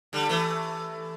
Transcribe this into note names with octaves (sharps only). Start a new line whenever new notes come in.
D3 G3
E3 A3